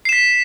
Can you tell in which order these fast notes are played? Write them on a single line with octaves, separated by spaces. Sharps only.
C7 E7 B6